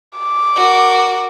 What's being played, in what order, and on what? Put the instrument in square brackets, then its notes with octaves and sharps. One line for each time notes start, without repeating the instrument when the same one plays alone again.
[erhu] D6
[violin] F#4 A#4